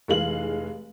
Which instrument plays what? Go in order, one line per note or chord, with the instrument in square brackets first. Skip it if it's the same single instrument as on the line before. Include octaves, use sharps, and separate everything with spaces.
[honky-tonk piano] F1 E3 G#3 F5 F#7